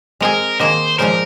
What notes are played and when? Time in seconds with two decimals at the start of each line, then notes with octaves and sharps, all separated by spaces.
0.20 G#3 C4 G#4 A#4 D#5
0.59 D#3 A#3 G#4 C5 D#5
0.99 A#2 F3 G#3 D#4 A#4 C5